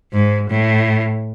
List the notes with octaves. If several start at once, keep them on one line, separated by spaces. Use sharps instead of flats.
G#2
A2